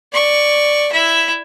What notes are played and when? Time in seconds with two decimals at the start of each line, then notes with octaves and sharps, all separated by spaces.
0.13 D5 C#6
0.92 E4 E5